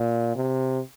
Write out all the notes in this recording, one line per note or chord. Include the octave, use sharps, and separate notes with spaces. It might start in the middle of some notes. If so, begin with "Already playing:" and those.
Already playing: A#2
C3